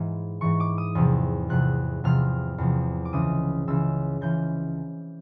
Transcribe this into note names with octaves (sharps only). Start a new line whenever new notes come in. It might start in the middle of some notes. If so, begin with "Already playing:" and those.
Already playing: G#2 E3
G#2 E3 C#6
D6
D#6
E2 C3 F3
E2 C3 F3 F#6
E2 C3 F3 F6
E2 C3 F3
D6
C#2 C#3 E3 D#6
C#2 C#3 E3 E6
C#2 C#3 E3 G6